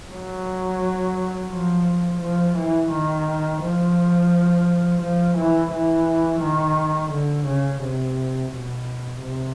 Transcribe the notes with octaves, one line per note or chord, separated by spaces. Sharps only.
F#3
F3
F3
E3
D#3
F3
F3
E3
E3
D#3
D3
C#3
C3
B2
C3